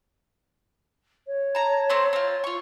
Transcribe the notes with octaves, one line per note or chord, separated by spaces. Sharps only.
C#5
A5 A#5
A3 C4 C5
C4 F4
F4 C#6